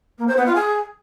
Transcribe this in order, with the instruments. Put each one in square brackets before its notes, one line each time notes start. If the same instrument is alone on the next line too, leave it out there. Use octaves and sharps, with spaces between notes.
[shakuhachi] A#3
C5
B3
F4
G#4